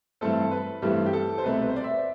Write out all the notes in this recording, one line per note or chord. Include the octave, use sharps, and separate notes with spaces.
G2 E3 A3 C4 A4
B4
G2 E3 A3 C4 G4
G4
A4
C5
C2 B2 A3 C4 B4
B4
C5
D5
E5